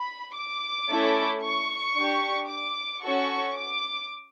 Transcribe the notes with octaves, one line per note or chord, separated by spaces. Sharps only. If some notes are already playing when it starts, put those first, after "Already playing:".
Already playing: B5
D6
A3 C#4 E4 A4
C#6
D4 G4
D6
C#4 F#4 A4 C#6
D6